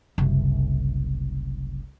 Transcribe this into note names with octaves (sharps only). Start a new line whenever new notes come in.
F#1 C2